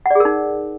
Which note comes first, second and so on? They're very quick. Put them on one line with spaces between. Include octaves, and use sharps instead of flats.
F#5 D5 G#4 A#4 D#4